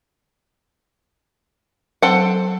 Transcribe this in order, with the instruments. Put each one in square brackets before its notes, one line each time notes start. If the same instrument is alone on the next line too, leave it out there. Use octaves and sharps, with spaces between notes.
[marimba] F#3 [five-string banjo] C4 A4 F#5